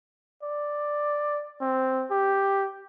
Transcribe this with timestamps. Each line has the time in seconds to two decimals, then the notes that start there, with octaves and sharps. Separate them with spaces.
0.43 D5
1.61 C4
2.11 G4